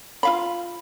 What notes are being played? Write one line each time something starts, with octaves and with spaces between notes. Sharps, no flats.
F4 F5 B5